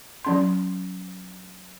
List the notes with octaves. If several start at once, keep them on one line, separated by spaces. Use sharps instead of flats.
F#3 C#4 C6